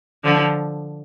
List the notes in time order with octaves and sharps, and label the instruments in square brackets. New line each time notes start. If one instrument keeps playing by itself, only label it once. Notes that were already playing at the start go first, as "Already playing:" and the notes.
[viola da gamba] D3 F3